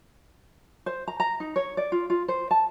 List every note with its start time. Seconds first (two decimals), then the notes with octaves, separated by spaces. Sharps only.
0.86 C5
1.08 A#5
1.20 A#5
1.40 D#4
1.56 C#5
1.77 D5
1.92 F4
2.10 F4
2.28 C5
2.51 A5